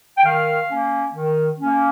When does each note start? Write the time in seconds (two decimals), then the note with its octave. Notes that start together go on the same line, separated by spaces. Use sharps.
0.18 G5
0.24 D#3 F5
0.69 A#3 C#4
1.14 D#3
1.59 A#3 C#4